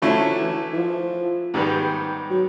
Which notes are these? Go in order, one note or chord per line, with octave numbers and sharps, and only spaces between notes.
D3 F3 F#3 A3 C#4 E4
E3
E3
F3
G#2 D#3 G3 B3
F#3